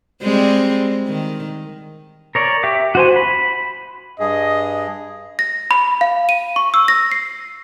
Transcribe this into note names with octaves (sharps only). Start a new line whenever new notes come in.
G3 G#3 C4
D#3
A#4 C#5 D5
G4 E5 D6
F#4 C5 G#5
B5
G2 G#4 D#5
A#6
B5
F5
D#7
C#6
E6
A#6
C7